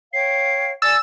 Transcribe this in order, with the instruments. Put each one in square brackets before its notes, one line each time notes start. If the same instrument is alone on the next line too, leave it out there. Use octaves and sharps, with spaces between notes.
[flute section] C#5 F5 G5 [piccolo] C7
[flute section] D5 G#5 [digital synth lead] E6 [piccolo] A6